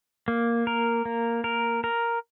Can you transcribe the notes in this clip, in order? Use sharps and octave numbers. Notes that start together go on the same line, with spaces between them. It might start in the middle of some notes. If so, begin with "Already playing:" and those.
A#3
A#4
A#3
A#4
A#4